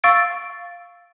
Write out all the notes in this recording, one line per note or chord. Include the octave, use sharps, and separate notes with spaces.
F5 C#6 E6 A6 D7